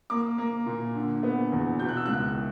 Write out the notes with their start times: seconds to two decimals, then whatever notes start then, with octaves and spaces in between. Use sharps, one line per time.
0.10 A#3 D6
0.38 A#3
0.66 A#2
0.95 D3
1.23 B3
1.52 E2
1.79 B2 G6
1.89 F#6
1.97 E6
2.06 C#2 F#6